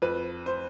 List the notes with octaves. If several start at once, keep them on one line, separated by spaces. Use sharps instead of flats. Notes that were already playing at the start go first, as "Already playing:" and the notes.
F2 B4
C5